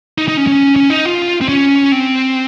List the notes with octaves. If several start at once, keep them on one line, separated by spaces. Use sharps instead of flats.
D#4
D#4
C#4
C#4
C#4
D#4
F4
C4
C#4
C4